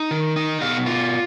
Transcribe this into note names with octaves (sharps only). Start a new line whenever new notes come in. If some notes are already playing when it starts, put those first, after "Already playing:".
Already playing: D#4
D#3
D#4
B2 F5
F4